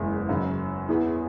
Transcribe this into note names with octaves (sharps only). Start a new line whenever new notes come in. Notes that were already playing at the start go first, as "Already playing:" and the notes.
Already playing: F#1 E2 E3 G#3
F#2 C#3 F#3
E2 E3 B3 G#4